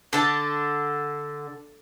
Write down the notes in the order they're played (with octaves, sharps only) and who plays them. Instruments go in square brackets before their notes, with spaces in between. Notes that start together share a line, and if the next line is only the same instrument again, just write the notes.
[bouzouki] D3 [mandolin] D4 A4 A5